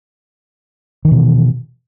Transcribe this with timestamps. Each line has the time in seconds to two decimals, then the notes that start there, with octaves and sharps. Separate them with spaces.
1.05 D#3
1.08 E3
1.11 B2